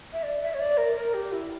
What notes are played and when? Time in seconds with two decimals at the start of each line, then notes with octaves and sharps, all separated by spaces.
0.13 E5
0.23 D5
0.41 E5
0.54 C#5
0.60 D5
0.77 A#4
0.96 A#4
1.14 G4
1.32 E4